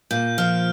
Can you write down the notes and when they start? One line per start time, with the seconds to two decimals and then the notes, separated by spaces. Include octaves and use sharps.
0.11 A#2 G6
0.38 F3 F6